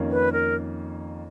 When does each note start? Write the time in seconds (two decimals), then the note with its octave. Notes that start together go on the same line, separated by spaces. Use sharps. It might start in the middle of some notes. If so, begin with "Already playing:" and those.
Already playing: F2 D#3 A#3 C#4
0.11 B4
0.33 A#4